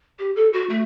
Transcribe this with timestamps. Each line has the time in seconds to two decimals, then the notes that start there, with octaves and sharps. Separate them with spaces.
0.19 G4
0.36 A4
0.53 F#4
0.70 A3